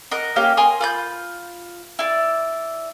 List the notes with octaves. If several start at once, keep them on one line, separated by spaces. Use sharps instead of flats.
A#4 D#5 F#5
A#3 C#4 G4 F5
A#4 G#5 C6 D#6
F4 B5 G6
E4 D5